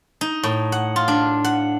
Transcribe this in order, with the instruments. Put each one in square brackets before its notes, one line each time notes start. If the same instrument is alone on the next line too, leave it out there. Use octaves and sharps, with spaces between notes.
[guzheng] D#4
A2
F#5
F4
D4
F#5